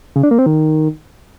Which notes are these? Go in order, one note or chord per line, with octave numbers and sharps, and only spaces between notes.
C#3
D4
A#3
C4
D#3